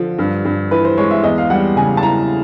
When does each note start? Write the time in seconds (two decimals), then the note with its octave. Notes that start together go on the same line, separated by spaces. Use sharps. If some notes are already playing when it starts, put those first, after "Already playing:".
Already playing: D3 F3
0.19 G2
0.45 G2
0.71 E3 B4
0.85 C5
0.97 G#3 C#5
1.11 E5
1.23 E2 D#5
1.38 F5
1.50 G3 F#5
1.77 C#3 G#5
1.97 A5
2.03 E3 A#5